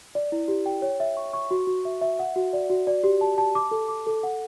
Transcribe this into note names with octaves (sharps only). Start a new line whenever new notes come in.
D5
E4
G4
G5
C#5
E5
C#6
C#6
F#4
F#4
E5
E5
F#5
F#4
D5
F#4
D5
G4
A5
A5
D6
A4
D6
A4
F#5